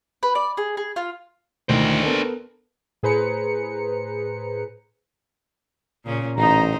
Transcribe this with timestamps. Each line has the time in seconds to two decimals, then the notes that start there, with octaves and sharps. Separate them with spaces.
0.23 B4
0.35 D5
0.57 G#4
0.77 G#4
0.96 F4
1.69 D2 A2 D#3 D4 C5
2.03 B3 A4 A#4
3.03 A2 G#4 B4 C5 A#5 C#7
6.05 A#2 C#3 C#4
6.37 A1 C#3 D#4 C5 A#5